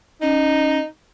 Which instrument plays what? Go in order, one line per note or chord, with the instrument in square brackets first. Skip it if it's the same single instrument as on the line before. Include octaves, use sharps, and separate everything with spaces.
[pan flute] C#4 [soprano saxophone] D#4